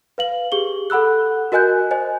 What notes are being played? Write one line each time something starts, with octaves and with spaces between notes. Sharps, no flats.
B4 F5 F#7
G4 G#4 G7
A4 F#5 B5 E6 F#6
F#4 A#4 D#5 G#5 F#6 G6
C5 D#5 G#5